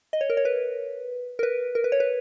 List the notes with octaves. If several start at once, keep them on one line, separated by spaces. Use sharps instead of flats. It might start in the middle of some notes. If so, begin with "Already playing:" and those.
D#5
C#5
A#4
C#5
B4
A#4
B4
A#4
B4
C#5
B4